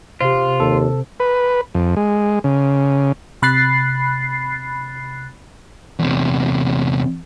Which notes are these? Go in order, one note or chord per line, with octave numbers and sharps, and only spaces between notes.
C3 F4 G4 C5
D#2 A4
B4
F2
G#3
C#3
C3 B5 F#6 A6 C7
E2 C3